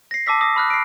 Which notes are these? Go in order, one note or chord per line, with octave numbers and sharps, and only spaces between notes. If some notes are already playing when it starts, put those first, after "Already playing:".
A#6 C7
A5 D6 E6 B6
D#6 A#6
B5 F6 F#6
C7 D7